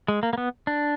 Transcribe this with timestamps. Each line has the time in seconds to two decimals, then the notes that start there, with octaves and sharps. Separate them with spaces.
0.08 G#3
0.23 A#3
0.33 A#3
0.38 B3
0.67 D4